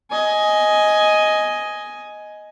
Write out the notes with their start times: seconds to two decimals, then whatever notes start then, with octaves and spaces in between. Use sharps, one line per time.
0.11 D#5 G#5